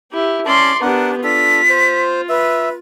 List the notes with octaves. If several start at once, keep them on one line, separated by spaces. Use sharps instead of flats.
E4 G4
C#4 D5 A5 C6
B3 D4 G4 A#4 F#5
D4 F4 A4 B6
C5
B4 E5